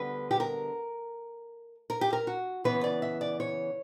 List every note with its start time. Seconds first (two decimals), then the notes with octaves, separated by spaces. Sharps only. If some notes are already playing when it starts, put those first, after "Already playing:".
Already playing: D2 D3 G3 B3 B4
0.31 G4
0.40 A#4
1.90 A#4
2.01 G4
2.13 A#4
2.27 F#4
2.64 C#3 E3 B3 E4 B4
2.84 D5
3.02 E5
3.21 D5
3.40 C#5